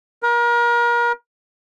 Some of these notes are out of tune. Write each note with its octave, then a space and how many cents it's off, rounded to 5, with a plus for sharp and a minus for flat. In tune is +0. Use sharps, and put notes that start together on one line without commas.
A#4 +35